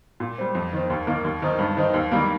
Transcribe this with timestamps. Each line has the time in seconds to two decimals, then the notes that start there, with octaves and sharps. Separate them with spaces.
0.20 A#2
0.38 G3 C4
0.55 F2
0.73 D#3 C4
0.90 D#2
1.07 D#3 A#3
1.25 D#2
1.42 D#3 C4 D#4
1.59 G2
1.77 D#3 C4 D#4
1.94 D#2
2.11 D#3 G3 A#3